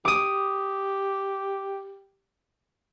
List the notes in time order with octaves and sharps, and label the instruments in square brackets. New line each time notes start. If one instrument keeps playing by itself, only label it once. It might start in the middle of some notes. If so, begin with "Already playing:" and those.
[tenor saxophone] G4 [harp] D6 D#6